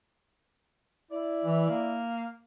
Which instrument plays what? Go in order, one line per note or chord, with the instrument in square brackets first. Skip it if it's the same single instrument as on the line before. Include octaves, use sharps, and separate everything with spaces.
[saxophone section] E4 D5
[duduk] E3
A#3